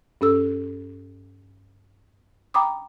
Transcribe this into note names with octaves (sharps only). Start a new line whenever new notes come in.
G2 C#4 A4 E6
G5 A#5 B5 D6 D#6